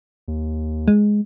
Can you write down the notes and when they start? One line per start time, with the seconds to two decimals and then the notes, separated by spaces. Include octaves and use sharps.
0.28 D#2
0.88 G#3